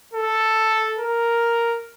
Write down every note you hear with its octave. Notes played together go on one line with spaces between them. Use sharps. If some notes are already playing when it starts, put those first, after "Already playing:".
A4
A#4